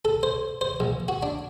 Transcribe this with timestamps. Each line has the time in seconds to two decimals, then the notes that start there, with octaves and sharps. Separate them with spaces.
0.05 A4
0.23 C5
0.61 C5
0.80 A#1
1.08 F#4
1.23 D4